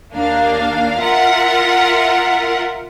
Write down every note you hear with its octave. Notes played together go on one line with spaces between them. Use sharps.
D#2 A#3 D4 F5
F4 A#4 E5 F#5